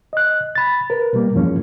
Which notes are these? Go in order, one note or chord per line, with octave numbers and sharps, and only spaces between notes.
D#5 F#6
B5 A6
A#4 B4
B2 G3 A#3
E2 G2 F3 G#3 A#3 C#4